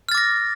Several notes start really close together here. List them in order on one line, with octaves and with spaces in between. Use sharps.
F6 A6 D6 A#6